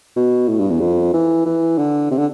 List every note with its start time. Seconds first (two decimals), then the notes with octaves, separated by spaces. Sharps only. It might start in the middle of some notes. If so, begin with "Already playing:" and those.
0.16 B2
0.48 A2
0.59 G2
0.70 E2
0.81 F2
1.14 E3
1.46 E3
1.78 D3
2.11 C3
2.18 D3